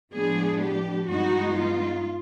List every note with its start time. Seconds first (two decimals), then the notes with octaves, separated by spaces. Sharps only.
0.13 A2 F3 G#3 B3 D4 G#4
0.60 G4
1.07 G2 E3 G#3 B3 D#4 F#4
1.56 F4